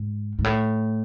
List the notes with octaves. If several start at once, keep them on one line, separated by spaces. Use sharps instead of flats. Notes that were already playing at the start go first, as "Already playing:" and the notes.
Already playing: G#2
G#2
A2